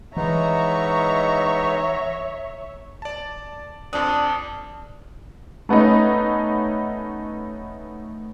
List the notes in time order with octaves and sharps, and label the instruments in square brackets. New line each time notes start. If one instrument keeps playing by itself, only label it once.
[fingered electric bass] E3 [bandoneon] G#3 B3 D#4 [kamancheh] C#5 E5 [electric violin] A#5 C#6
[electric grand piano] D5 A5
[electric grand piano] F2 F3 D#6 [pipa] D4
[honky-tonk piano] A3 B3 C#4 D#4